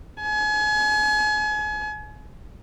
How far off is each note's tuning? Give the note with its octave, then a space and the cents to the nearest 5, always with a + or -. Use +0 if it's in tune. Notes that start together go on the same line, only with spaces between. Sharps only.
G#5 +35